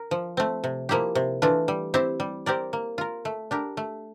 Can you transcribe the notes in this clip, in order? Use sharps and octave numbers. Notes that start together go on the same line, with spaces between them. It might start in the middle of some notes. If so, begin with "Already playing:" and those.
Already playing: A#4
F3
A3 C4
C3
F3 A#3 E4 G4
C3
E3 A3 D4 F4
G3
C4 E4 G4 C5
G3
C4 G4 A#4 D5
A#3
F4 A#4
A3
D4 G4 A#4
A3